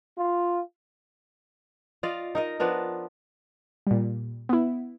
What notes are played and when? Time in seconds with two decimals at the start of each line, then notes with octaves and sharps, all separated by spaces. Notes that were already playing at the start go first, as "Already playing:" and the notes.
0.18 F4
2.03 F4 D5 D#5 F5
2.35 D#4 A#4 D#5
2.60 F3 B3 D4 A#4
3.87 A#2 G3
4.49 B3 E4